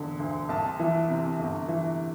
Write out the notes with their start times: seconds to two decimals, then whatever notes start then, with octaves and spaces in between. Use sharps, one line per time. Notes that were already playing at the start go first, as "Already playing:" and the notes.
Already playing: E1 D3
0.19 D2
0.49 C2 A5
0.80 E3
1.10 C3
1.40 G1
1.68 E3